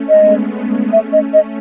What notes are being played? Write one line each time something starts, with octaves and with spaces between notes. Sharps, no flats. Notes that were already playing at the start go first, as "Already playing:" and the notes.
Already playing: A3 C#4
G#3 B3 D#5
A3 C#4 E5
D#5
D#5